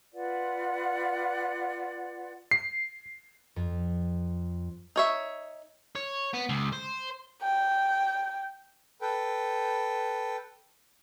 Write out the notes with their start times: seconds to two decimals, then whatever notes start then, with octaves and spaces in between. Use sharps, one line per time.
0.13 F4 B4 D5 F#5
2.51 C7
3.56 F2
4.96 D#4 C#5 E5
5.96 C#5
6.34 B3
6.49 C#2
6.73 C5
7.43 G5
9.02 A4 B4 G5